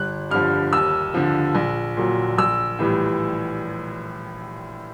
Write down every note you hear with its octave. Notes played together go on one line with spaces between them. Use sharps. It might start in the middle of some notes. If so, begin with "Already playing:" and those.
Already playing: G1 F#6
G2 D3 F3 F6
D#2 E6
D3 F3
A#1
A#2 F#3
A#1 E6
A2 E3 G3